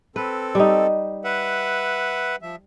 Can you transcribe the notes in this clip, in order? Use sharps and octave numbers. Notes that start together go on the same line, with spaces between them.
C4 A4 B4
G3 D#4
B4 E5 F#5
F3 E5